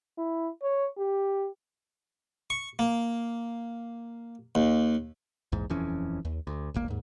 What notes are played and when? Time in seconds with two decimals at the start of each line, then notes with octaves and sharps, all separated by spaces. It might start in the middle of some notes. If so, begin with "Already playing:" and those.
0.18 E4
0.63 C#5
0.98 G4
2.50 C#6
2.79 A#3
4.55 D#2
5.52 A#1 E2 G#2
5.70 D#1 F2 E3 C#4
6.25 D#2
6.47 D2
6.74 D1 G#1 A#3
6.88 D#2 G#2